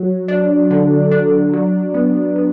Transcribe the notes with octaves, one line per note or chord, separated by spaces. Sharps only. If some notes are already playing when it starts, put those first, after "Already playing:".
Already playing: F#3
D4
D3
D4
F#3
B3
B3